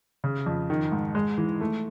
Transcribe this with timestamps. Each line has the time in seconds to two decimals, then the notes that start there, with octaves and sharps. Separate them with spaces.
0.24 C#3
0.46 F2
0.70 D#3
0.92 G#2
1.15 G#3
1.38 E3
1.61 A3